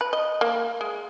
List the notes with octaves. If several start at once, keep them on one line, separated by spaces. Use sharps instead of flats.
B4
D#5
A#3
G#3